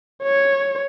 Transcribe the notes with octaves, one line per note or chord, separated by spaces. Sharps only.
C#5